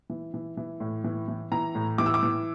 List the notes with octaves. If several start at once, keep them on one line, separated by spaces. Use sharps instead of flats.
E3
E3
E3
A2
E3
E3
E3 A#5
A2
E3 D6
E6
D6
E3